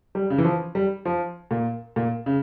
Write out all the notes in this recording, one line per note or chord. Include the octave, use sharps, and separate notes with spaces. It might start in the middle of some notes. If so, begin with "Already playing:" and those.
G3
C#3
E3
F3
G3
F3
A#2
A#2
C#3